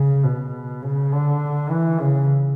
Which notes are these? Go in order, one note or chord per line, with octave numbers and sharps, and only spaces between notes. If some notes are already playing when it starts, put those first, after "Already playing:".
Already playing: C#3
B2
C#3
D3
E3
C#3